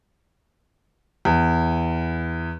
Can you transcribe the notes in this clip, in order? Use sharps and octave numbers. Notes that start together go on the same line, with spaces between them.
E2